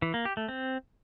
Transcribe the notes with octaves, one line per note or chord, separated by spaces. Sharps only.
E3
A#3
G4
A3
C4